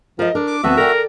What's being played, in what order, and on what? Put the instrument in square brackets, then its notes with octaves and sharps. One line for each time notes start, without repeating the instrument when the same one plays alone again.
[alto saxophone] F3 [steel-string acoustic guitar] A#4 D#5
[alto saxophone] D4 [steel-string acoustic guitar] A#4
[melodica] D6
[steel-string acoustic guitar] D2 C4 A5 [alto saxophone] B3 [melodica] F#4 E5
[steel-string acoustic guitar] A4 D5 G5 [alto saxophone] A#4